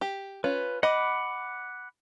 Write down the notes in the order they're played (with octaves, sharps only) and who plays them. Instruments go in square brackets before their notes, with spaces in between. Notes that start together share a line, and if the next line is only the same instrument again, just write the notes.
[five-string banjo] G4
[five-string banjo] C#4 F4 [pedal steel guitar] B4
[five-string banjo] D#5 [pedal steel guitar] F#5 B5 D6